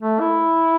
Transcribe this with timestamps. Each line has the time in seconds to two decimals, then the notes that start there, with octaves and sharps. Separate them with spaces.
0.02 A3
0.20 E4